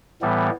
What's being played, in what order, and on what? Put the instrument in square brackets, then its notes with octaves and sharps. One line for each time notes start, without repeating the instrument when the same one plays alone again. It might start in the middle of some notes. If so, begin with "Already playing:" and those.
[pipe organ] A2 E3 G3 B3